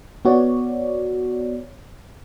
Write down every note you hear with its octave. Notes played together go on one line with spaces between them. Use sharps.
B3 F#4 C#5 D5